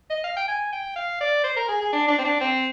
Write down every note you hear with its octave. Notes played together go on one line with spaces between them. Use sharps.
D#5
F5
G5
G#5
G5
F5
D5
C5
A#4
G#4
G#4
D4
D4
C4
D4
C4